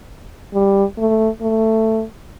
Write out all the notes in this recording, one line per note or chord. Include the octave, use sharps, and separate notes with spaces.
G3
A3
A3